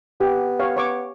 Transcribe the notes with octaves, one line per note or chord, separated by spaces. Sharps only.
B3 G4 F#5
G4 C#5 F5
C#5 C#6 D6